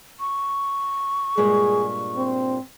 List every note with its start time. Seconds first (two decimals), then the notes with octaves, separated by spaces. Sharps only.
0.20 C#6
1.37 G2 A#2 G#3 G#4
2.16 C4